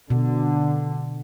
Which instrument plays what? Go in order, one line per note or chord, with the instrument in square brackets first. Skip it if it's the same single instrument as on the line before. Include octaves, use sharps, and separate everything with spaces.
[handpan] B2 [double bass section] D3